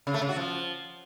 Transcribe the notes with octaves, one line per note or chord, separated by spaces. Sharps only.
C#3
A3
C#3
F#4
F3